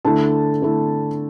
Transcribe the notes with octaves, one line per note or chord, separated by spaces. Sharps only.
D3 A3 E4 A5
D3 A3 E4